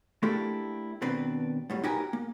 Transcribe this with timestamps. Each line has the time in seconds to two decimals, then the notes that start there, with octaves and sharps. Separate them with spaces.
0.23 A3 A#3 D4 E4 G4 A4
1.02 D#2 B2 C4 D4 B4
1.70 F#2 A2 G3
1.83 D#4 F#4 G4 A#4 B4 G#5
2.13 A#3